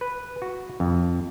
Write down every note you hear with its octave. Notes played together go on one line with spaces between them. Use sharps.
B4
F#4
F2